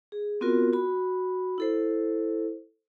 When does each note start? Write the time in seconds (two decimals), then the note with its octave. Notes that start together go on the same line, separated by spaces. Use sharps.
0.12 G#4
0.41 B3 C4 F4 F#4 A#4
0.73 F#4 B5
1.58 E4 A4 C5